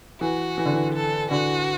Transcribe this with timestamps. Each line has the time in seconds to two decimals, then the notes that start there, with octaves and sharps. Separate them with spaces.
0.21 E3 F#4
0.58 E3
0.65 D3
0.73 E3
0.95 A4
1.31 D3 F#4